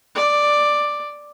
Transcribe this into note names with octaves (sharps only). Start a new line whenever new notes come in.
D5